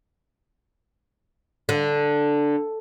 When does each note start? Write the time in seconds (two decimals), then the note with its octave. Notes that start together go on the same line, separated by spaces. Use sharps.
1.69 D3